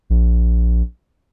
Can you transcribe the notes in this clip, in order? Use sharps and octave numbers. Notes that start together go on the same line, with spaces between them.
A#1